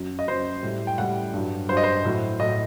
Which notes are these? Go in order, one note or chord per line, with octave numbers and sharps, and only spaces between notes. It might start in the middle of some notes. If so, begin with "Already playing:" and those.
Already playing: F#2 F#3
D#5
F#2 F#3 C5
A2 G3
G5
A2 G3 F#5
G2 F#3
G2 F#3 C5
D#5
C5
A2 F#3
A2 F#3 D#5